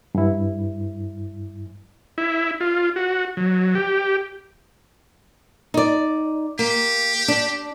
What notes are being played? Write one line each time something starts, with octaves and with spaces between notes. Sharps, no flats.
G2 E4
E4
F4
F#4
F#3
G4
D#4 D5
A#3 G4
D4